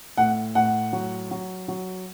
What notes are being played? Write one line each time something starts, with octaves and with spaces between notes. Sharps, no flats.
A2 F#5
A2 F#5
F#3
F#3
F#3